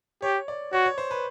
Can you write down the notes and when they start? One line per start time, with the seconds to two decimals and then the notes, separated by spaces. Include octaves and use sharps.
0.22 G4 C#5
0.48 D5
0.73 F#4 C#5
0.85 C#5
0.98 C5
1.11 B4